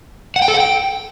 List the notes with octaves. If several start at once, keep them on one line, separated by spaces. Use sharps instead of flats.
F#5
G5
A4
F#5
G5